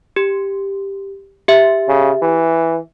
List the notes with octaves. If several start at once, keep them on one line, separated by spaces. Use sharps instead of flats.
G4
G4 E5
C#3
E3